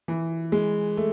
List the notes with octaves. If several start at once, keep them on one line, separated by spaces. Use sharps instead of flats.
E3
G#3
A3